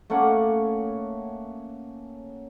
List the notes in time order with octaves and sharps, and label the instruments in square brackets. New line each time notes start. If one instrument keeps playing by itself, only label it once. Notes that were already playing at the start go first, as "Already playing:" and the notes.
[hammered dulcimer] A3 A#3 C#4 F#5